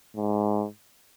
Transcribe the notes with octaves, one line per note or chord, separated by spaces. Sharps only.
G#2